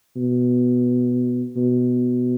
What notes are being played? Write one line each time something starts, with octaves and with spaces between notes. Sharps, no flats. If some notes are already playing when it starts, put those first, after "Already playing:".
B2
B2